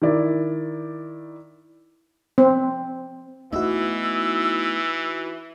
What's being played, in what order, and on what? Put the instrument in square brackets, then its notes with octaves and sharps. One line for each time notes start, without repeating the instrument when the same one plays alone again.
[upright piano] D#3 E4 D5
[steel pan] C4
[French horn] E3 [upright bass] A3 B3 [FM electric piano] D#4 E4 F#4 [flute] E6